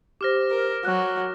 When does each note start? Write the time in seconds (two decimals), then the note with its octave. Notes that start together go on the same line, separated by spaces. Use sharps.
0.21 G4 C5 D6 F6 A#6
0.51 A#4
0.85 F#3 F#6